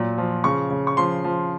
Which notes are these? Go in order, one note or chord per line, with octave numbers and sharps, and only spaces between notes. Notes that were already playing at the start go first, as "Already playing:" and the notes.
Already playing: A#2 F#3
F3
C#3 C#6
C#3
C#6
F3 C6
F3